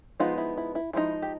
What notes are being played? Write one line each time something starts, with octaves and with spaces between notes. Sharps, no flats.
F3 G#3 B3 D#4 F4
E4
E4
E4
F3 G#3 B3 D#4 E4
G4